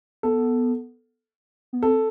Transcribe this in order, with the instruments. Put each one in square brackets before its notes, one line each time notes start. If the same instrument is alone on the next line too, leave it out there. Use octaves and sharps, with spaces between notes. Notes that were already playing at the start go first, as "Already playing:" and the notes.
[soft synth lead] B3 [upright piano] A4
[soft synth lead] B3
[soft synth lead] C4 [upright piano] A4